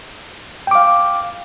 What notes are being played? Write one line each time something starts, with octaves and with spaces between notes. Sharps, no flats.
F5 G5 D6